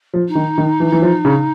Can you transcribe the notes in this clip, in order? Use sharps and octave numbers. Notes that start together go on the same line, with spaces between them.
F3
D#4
D#3
D#3
E3
E3
F3
C#3